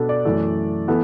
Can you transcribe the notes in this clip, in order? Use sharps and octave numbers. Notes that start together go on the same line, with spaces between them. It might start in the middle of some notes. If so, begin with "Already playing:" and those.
Already playing: B2 B3 D4 A4
D5
F#2 E3 A3
E3 B3 A4